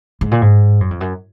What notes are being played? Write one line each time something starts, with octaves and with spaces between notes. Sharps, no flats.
G#2
A#2
G#2
F#2
F2
F#2